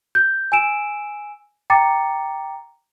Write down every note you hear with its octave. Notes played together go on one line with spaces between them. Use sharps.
G6
G#5 E6 D7 E7
G5 A#5 D6 A6 C#7